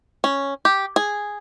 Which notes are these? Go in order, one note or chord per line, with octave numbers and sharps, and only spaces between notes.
C#4
G4
G#4